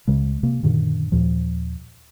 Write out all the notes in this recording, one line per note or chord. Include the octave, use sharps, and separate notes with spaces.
C#2 C#3 G#3
C3 A#3
F#2 A#2 D3 D#3
D#2 A#2 F3